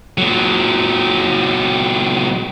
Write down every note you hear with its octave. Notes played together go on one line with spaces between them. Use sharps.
A#2 F#3